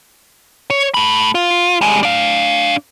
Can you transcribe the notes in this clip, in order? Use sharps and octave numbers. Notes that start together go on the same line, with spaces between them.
C#5
A3 B5
F4
G3 G#3
D4 F5